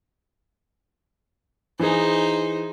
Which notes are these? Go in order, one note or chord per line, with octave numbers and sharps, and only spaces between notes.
E3 D#4 G#4 C5